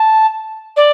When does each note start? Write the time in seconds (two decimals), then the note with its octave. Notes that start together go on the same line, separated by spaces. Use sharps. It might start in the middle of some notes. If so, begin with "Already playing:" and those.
Already playing: A5
0.76 D5